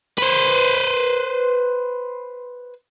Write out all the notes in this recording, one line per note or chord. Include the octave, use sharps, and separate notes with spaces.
B4 C5